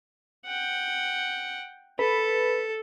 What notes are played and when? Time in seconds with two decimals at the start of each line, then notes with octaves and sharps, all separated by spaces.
0.46 F#5 G5
1.99 A4 B4